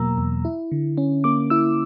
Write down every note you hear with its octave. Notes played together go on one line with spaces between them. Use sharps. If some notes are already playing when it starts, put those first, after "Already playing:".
Already playing: E2 B2 F#3 A#3 A#5 E6
E2
E4
D3
C#4
A#3 D6
E4 E6